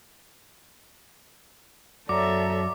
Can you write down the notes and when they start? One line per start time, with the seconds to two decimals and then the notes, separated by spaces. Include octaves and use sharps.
2.09 F#2 F#4 A4 C#5 D5 E5 A#5 D6